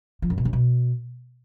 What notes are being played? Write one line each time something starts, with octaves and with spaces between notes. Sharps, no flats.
F3
F#2
B2
F#2
B2